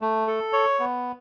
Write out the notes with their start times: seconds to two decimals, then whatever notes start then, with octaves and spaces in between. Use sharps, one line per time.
0.02 A3
0.27 A4
0.53 C#5
0.80 B3